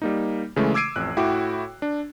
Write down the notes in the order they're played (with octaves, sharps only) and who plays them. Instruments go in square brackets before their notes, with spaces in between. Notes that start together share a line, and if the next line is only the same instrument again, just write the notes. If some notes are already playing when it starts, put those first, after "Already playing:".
[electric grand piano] G3 A#3 D#4
C#3 E3 G#3 A3
D6 E6 G#6 C7 D7 D#7
A1 F2 F#6
A2 E4 F#4 G5 D6
D4